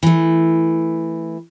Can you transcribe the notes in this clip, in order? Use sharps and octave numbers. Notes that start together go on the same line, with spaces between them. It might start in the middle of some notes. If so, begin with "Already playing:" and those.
E3 A3